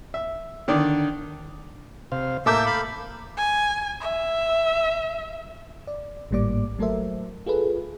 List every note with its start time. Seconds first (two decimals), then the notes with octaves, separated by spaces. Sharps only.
0.14 E5
0.68 D3 D#3 D5
2.12 C3 C5 F5
2.46 A2 A#3 A4 E5 D6 E6 G6
2.66 F5 B5
3.37 G#5
4.00 E5
5.87 D5
6.31 G#1 A2 G3 A#3 D5 D6
6.79 F#3 A3 A4 A#4 C5 E5
7.46 F4 G#4 A4 B4